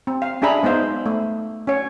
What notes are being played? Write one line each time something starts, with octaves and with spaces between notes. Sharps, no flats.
C4
F5
C#4 D4 G#4 E5 A#5 B5
G#3 B3 D#4 C5 F5
A3
C#4 C#5